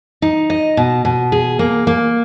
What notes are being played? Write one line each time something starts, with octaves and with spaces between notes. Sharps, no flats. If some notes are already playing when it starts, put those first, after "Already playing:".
D#4
D#5
B2
B2
G#4
A#3
A#3